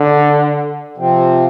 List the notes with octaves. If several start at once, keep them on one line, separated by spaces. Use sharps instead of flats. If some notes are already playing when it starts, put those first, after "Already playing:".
Already playing: D3
C3 F3 C4